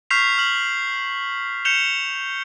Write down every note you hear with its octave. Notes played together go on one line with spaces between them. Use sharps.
C#6 F6 G6 B6 C7 F7
F6 F#7
G6 C#7 E7 F7 G7